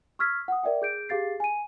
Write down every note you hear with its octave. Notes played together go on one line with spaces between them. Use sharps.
C#6 E6 F6 G#6 B6
F#5 D#6
A#4 D5 E5 G5
G#4 G6 D7
G4 G#4 F5 A6 C7
G#5 D#7